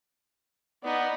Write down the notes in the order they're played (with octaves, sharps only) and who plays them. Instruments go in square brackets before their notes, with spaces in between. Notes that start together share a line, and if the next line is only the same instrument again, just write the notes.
[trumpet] B3 [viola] D#4 D5